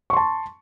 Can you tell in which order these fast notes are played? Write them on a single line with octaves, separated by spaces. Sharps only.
C#6 C6 A5